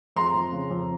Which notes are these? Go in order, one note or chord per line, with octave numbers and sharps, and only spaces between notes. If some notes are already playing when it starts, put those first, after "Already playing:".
F2 A#5 C6
F2
C#3
F2